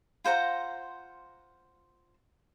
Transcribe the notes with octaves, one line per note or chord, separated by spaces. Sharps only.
F4 C5 F#5 A#5